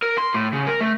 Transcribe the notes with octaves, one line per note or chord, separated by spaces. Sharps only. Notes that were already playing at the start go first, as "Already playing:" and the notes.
A#4
C6
A2
C#3
A#4
A3